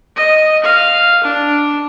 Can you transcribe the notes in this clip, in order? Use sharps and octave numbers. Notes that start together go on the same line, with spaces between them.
D#5
F5
D4